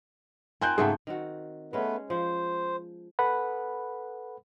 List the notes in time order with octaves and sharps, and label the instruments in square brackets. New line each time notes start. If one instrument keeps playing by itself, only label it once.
[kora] C4 F4 A#4 [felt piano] G#5 F#6 G6
[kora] G#2 C#3 A3 [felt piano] G#4 E5 F#5
[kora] D#3 C4 F#4
[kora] G#3 C#4 [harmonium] A3 B3 B4
[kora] F3 [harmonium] C5
[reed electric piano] A4 B4 F#5 B5